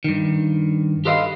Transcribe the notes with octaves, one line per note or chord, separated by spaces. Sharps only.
G2 D#3
G4 A4 B4 C5 D#5 F5